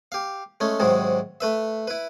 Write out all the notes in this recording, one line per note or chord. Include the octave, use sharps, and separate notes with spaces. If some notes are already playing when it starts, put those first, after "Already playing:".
G4 F5
G#3 A3 C#4
G#2 C3 D#3 F#3 G#3
A3 B4 E5
E4 B4